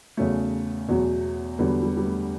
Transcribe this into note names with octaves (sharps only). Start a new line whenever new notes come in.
E2 C#3 F#3 A3
E2 B2 F#3
E2 D3 F#3 G3 B3
G3
G3
A3